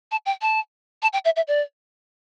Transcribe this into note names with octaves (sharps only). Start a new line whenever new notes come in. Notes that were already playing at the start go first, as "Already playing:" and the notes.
A5
G5
A5
A5
G5
E5
E5
D5